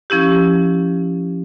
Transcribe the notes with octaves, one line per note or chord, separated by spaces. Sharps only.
F3 C#4 E4 G4